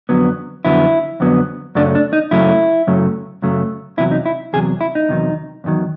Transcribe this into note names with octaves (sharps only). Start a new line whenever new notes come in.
F2 D3 F#3 B3
F2 D3 F#3 B3 E4
F2 D3 F#3 B3
F#2 C#3 F#3 A3 D4
D4
D#4
F#2 C#3 F#3 A3 E4
F#2 C#3 F#3 A3
F#2 C#3 F#3 A3
E2 C3 D#3 F#3 E4
D#4
E4
E2 C3 D#3 F#3 G#4
E4
D#4
E2 C3 D#3 F#3
E2 C3 D#3 F#3